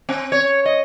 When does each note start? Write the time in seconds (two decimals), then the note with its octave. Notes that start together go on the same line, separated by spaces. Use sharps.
0.09 C4
0.32 C#5
0.66 D#5